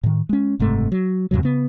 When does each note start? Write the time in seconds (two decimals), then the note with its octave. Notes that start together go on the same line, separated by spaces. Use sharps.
0.03 A2 D#3
0.29 G#3 C#4
0.59 F#1 G#2 C3 A3
0.92 F#3
1.31 E2 G2 C3 F#3
1.43 C#3 B3